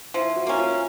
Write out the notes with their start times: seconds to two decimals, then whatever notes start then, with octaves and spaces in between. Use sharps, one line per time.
0.14 F3 E4
0.36 F#4
0.47 A#3 C#4
0.58 F4